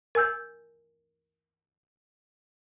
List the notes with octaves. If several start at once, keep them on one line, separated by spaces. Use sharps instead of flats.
A#4 G#5 E6 G6